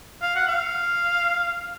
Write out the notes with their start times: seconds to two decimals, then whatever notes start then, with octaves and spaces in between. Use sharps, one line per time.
0.22 F5
0.35 F#5
0.48 F5